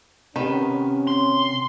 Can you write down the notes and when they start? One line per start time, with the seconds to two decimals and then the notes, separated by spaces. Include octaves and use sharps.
0.36 C3 D#3 B3 C#4 B4
1.07 C6